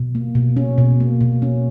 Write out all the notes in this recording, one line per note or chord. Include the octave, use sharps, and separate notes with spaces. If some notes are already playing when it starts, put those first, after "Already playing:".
Already playing: B2
A#3
B2
C#4
B2
A#3
B2
C#4